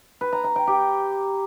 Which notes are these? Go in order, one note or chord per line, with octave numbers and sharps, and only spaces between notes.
B4
A#5
A#5
G5
G4